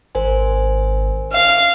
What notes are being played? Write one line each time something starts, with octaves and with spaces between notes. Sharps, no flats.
G#1 A#4 C5 G#5
F5